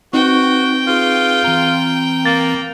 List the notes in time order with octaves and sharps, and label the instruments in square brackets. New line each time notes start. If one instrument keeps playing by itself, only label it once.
[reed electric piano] C4 D#4 [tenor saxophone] F#4 [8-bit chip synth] B4 C#6 [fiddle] G5
[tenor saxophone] F4 [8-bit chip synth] G#4 B4
[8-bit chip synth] E3 C4 A#5
[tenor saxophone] A#3 [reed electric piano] A6